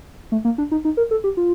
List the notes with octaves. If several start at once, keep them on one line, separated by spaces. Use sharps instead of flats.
A3
A#3
D4
D#4
D#4
A#4
A4
G4
F4